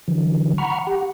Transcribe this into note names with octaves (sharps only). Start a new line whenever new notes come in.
D3 E3 F#3
F#5 A#5 B5 C#6 F6
G4 F#5